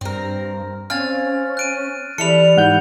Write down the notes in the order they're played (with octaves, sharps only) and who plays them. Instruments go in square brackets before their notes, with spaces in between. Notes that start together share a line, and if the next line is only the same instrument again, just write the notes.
[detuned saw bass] G2 [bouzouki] C4 A#4
[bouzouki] C4 F5 G#5 [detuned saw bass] C#4 [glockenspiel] F6 A6
[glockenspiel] F#6 D7 D#7
[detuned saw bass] E3 [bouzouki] G3 E4 A4 [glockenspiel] C#7 F7
[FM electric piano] G#2 F#5 G6